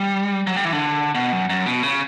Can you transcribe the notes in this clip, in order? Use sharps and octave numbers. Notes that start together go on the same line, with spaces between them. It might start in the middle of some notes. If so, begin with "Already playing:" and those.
Already playing: G3
F#3
G3
E3
D3
B2
F#2
F#2
B2
C#3